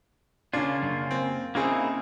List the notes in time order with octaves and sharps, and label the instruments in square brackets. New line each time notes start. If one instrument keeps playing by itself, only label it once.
[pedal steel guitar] C#3 A#3 F4 [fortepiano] C#4 D4
[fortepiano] F#2
C4
[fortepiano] C#3 C4 G#4 [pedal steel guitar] A#3 D#4 E4